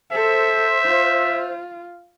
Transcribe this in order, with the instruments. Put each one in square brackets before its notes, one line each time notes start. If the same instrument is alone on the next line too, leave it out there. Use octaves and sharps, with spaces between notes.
[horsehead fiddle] A4 [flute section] C5 [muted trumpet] E5
[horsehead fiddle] F4